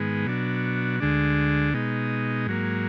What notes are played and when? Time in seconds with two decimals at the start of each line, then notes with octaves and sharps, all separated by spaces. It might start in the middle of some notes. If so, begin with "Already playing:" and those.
Already playing: G#2 D#3 G#3 B3
0.26 B2 F#3 D4
1.00 D2 D3 G#3 D4
1.73 B2 G#3 D#4
2.46 G#2 F#3 A#3